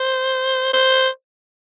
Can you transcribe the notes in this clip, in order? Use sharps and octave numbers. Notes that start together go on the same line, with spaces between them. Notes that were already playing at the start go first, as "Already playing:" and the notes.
Already playing: C5
C5